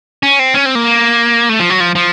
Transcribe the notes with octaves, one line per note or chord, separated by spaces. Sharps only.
C#4
C4
C#4
C4
A#3
A3
F3
F#3
F3
F3